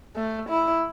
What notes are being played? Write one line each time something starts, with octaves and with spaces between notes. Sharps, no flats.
A3
E4